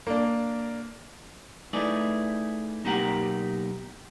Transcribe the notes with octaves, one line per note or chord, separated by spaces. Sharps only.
A#3 D4
A3 D#4 E4 G#4 B4 D5
B1 A#3 D#4 G4 A#4 F#5